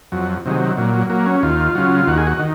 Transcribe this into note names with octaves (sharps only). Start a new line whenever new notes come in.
F2 F#3
C3 D#3 F#3
G#3
F#3
A#2 F#3
F#3
F#3 A#3
C#4
D#2 F4
C#3 F#3
D#2 F#4
G#4
F#4
D#3